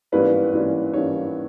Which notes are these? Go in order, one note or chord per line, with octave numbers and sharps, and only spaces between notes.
G#1 G2 E3 A#3 C#4 B4
G#1 G2 E3 A#3 C#4
G#1 G2 E3 A#3 C#4 C#5